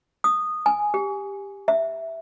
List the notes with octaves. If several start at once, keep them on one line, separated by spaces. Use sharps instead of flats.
D#6
G#5
G4
E5